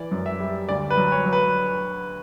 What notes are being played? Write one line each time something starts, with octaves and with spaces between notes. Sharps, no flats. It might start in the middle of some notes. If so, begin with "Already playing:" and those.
Already playing: E3 D5
F#2
E5
G3
D2 D5
B4
F#3
C#5
F#3
B4